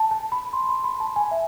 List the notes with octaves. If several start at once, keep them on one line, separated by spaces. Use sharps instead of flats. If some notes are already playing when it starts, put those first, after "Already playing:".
Already playing: A5
A5
B5
C6
B5
B5
A5
G#5
E5